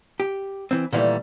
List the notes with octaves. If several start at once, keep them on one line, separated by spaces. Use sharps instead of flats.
G4
E3 C4
A#2 D#3 E3 F#3 G3 A3